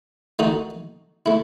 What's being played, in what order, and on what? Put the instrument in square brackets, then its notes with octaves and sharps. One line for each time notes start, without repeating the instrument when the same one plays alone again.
[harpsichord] D#3 A3 D#4 F#4
A3 E4